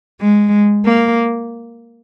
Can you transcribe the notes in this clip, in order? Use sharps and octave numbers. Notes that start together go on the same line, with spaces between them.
G#3
A#3